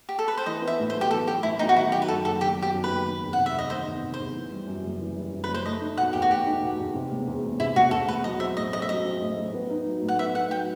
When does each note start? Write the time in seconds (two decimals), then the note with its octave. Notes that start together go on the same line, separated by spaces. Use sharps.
0.09 G4
0.19 A4
0.28 B4
0.38 C5
0.46 E3 D#5
0.62 B3
0.67 E5
0.79 A2
0.90 C5
0.96 B1
1.01 G4
1.11 E3 A4
1.28 B3 G4
1.43 A2 E4
1.59 B1 D#4
1.69 F#4
1.76 D#3 E4
1.92 F#3 G4
2.02 B4
2.08 F#2 A4
2.24 F#1 A4
2.41 D#3 G4
2.57 F#3
2.62 G4
2.73 F#2
2.84 B4
2.89 F#1
3.06 D#3
3.22 E2
3.33 C3 F#5
3.46 E5
3.54 E2 D#5
3.70 D#3 C5
3.87 E2
4.03 C3
4.14 C5
4.19 E2
4.35 E3
4.52 G3
4.67 F#2
4.84 F#1
5.00 E3
5.16 G3
5.33 F#2
5.44 F#1 B4
5.54 C5
5.65 A3 D#5
5.81 D#4
5.97 B2 F#5
6.13 E2 G4
6.22 F#4
6.29 A3 G4
6.47 D#4
6.63 B2
6.79 E2
6.95 C3
7.11 E1
7.27 E2
7.43 E1
7.60 C3 E4
7.76 E1 F#4
7.91 E2 A4
8.08 E1 B4
8.24 F#3 D#5
8.40 C4 E5
8.57 A2 D#5
8.72 A1 D#5
8.82 E5
8.89 F#3 D#5
9.05 C4
9.21 A2
9.38 A1
9.54 B3
9.70 D#4
9.86 F#3
10.02 A2
10.08 F#5
10.19 B3 E5
10.34 D#4 F#5
10.50 F#3 G5